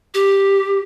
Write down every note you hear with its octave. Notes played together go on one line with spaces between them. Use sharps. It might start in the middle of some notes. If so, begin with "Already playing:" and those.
G4